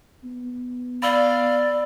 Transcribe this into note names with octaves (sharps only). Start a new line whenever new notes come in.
B3
D5 F5 B5 E6 G7